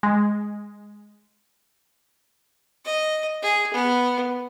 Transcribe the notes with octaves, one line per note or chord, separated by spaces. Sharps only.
G#3
D#5
G#4
B3